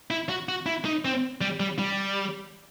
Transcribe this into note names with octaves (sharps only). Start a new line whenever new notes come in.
E4
F#4
F#4
E4
D#4
C4
G3
G3
G3